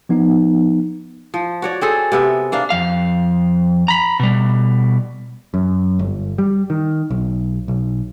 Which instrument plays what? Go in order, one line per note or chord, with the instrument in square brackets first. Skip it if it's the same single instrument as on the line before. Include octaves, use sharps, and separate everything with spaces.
[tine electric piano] F3 B3 D#4
[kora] F3
F#4 C#5 D5
C4 G#4 A4
C3 B3 E5
A#3 D4 F5
[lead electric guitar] F2 F5
A#5 B5
B2 G3
[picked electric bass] F#2
G1
G3
D#3
B1
B1